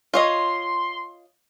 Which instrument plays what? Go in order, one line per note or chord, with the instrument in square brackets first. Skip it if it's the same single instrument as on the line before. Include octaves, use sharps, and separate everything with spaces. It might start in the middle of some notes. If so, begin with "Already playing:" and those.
[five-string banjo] F4 C#5 D#5 [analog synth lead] C6